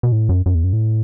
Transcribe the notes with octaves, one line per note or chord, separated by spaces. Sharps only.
B2
A2
F#2
F#2
E2
F#2
A2